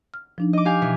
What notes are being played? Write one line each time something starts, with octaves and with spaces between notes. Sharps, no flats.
F6
F3 D4 D#4
D#5 D6
G4 F5 G#5
B2 E3